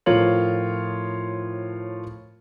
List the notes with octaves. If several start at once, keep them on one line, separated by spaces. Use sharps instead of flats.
A2 F3 F4 A#4 C#5 F#7